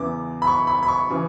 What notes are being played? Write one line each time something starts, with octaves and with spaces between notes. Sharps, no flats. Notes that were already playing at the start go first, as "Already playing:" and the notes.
Already playing: E2 C#3 E3 D6
B5
C#6
B5
B5
C#6
C#3 E3